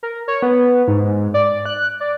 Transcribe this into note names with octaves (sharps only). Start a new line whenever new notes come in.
A#4
C#5
B3
G#2
D5
F#6
D5